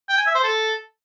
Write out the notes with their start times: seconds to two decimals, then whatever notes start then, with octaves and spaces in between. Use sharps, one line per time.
0.09 G5
0.18 G#5
0.26 E5
0.35 C5
0.44 A4